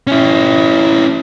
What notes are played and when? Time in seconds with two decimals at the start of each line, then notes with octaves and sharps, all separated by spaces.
0.07 C#4 E4